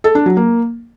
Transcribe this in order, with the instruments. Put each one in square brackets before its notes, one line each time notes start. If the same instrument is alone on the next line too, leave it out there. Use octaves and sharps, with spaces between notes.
[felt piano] A4
D4
F#3
A#3